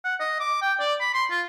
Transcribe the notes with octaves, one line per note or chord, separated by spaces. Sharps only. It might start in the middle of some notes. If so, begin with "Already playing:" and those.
F#5
D#5
D6
G5
D5
B5
C6
F4